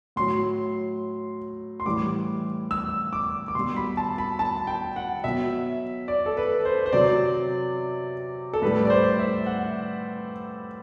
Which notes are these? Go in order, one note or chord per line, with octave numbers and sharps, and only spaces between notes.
A2 F#3 C6
C6
A2 E3 G3 D6
E6
D6
D6
B2 G3 C6
B5
A5
B5
A5
G5
F#5
B2 F#3 E5
D5
A4
B4
C5
C5
C3 F#3 D5
A4
A2 G3 B4
D5
C5
E5
F#5